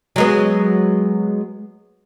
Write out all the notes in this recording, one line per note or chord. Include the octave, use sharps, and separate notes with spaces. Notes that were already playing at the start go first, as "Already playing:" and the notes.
F#3 G#3 B3